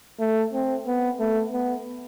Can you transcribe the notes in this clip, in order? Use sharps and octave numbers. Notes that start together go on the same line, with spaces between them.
A3
C4
B3
A3
B3